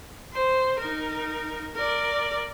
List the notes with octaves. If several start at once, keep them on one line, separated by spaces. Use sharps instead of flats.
C5
D#4 A#4
A#4 D5